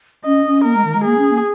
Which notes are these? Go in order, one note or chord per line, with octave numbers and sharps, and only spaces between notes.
C#4 D#5
C#4
A#3 A#4
G#3
D#3
G#3
A#3 G#4
C#4
A#3